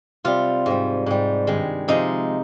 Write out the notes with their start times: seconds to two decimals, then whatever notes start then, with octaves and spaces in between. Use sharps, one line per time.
0.24 C3 G3 F4
0.66 G#2 G3
1.06 G#2 G3
1.47 G2 D#3 G#3
1.88 C3 F3 G#3 D#4